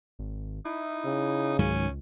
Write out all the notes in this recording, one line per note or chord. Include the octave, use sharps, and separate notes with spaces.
G#1
D#4 E4
C#3
C#2 G#2 D#3 F#3 C#4